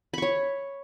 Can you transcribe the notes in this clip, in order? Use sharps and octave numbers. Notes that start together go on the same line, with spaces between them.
C#5 B5 C#6